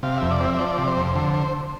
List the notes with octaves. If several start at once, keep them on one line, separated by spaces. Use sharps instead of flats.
C3 F5
F2 E5
D5
C4 E5
E5
F3 D5
C3
C5
F2
D3 C5
C5